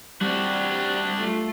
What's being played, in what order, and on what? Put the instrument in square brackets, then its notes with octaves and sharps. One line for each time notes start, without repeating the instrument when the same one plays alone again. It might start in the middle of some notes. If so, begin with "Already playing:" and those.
[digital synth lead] G3 [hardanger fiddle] C4 E4 [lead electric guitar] D4 F#4
[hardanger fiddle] A3 F4